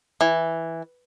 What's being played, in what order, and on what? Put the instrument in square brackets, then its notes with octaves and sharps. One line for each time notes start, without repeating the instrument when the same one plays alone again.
[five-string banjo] E3